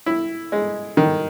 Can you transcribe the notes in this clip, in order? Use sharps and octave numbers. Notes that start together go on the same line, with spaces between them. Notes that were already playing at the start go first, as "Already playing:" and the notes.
E4
G#3
D#3